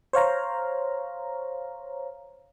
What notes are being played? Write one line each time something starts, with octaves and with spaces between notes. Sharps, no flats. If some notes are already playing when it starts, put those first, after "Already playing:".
C5 C#5 F5 A#5